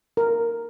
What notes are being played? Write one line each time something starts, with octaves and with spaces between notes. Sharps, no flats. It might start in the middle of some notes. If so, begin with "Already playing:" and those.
A#4